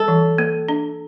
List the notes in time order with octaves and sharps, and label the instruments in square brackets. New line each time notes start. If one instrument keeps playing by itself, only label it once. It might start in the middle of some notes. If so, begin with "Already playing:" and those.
Already playing: [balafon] G3 [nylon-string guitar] A4
[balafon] E3
A#3
D4